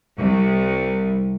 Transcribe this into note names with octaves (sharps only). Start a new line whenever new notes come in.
C2